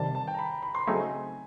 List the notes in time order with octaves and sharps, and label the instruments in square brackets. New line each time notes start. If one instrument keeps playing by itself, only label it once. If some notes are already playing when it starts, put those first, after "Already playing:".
Already playing: [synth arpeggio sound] C3 D#3 G3 [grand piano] A5
[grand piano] A5
G5
A#5
B5
B5
C6
[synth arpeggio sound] C#3 F#3 A3 C4 D#4 [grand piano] G#5